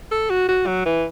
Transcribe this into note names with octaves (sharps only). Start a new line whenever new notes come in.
A4
F#4
F#4
F#3
E3